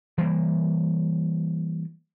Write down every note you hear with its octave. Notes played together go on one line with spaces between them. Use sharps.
E3 G3 A#3